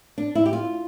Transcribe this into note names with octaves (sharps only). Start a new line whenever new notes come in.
D4
E4
G4
F4